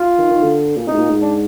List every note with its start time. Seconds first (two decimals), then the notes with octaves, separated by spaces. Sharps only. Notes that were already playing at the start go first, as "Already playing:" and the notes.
Already playing: F4
0.19 D#3
0.31 D#3
0.42 D3
0.76 A#2
0.87 C3 D#4
0.93 G#2
0.98 A#2
1.10 G#2
1.22 D4